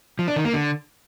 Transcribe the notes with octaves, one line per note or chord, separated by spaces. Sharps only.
F3
D4
D#3
A#3
D3